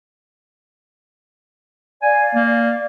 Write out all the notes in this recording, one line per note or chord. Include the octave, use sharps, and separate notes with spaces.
D5 F5 G#5
A#3